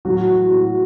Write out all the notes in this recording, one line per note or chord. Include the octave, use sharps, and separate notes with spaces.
A2 F#3 F#4
E3
A2